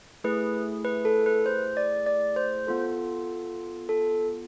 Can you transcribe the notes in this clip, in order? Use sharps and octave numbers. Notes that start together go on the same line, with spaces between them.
A3 E4 G#4 B4
B4
A4
B4
C5
D5
D5
C5
B3 F4 A4
A4